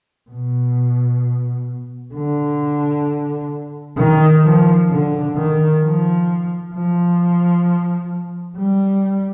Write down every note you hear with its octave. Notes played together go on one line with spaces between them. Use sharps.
B2
D3
D#3
F3
D3
D#3
F3
F3
G3